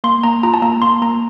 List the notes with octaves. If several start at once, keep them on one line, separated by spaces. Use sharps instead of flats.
A#3 C6
A#3 A#5
F4 A#5
A5
A#3 A#5
A#3 C6
A#3 A#5